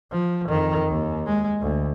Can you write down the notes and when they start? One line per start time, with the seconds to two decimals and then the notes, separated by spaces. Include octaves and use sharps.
0.11 F3
0.48 F2 D#3
0.89 D#2
1.26 G#3
1.61 D2